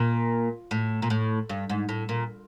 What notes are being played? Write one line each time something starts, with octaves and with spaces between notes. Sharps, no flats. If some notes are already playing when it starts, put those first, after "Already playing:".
Already playing: A#2
A2
A#2
A2
G2
G#2
A2
A#2